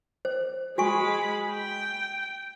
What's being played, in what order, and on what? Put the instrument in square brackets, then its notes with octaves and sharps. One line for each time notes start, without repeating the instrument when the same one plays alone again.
[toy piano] C5
[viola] G#3 B5 [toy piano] F#4 G#5 C#6
[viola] G5